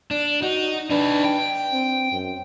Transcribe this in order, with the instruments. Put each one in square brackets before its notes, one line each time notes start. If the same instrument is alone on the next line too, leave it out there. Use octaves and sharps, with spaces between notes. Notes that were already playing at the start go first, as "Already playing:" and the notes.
[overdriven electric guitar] D4
[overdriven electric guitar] D#4 [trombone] F#4
[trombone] D4 [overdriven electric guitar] D#4 B4
[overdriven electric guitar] G5
[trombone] C4
F#2